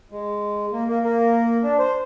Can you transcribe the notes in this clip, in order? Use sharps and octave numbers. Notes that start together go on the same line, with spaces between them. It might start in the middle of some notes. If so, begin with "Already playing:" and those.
G#3
A#3
A#3
A#3
D4
C5